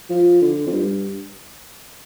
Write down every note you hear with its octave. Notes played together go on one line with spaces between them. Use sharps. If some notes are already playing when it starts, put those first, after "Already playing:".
F3
D3
F2
G2